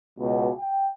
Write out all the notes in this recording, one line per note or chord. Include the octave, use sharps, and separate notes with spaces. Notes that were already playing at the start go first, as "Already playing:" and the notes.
C#2 B2
G5